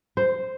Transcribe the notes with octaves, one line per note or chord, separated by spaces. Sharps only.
C5